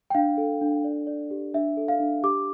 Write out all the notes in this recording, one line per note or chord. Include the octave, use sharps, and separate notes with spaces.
G5
D4 F5
A4
D4
D5
D5
G4
D4 E5
A4
F5
D4
G4 D6